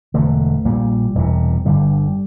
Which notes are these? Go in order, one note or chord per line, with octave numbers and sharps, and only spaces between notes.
E1 E2 D3 A3
A#1 A#2 G3
E1 E2 C3
G1 G2 D3 G3